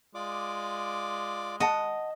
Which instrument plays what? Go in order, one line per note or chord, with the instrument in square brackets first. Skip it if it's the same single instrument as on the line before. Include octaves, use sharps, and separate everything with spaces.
[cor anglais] G#3 [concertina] F4 D5 D6
[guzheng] D#5 [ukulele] F#5 A5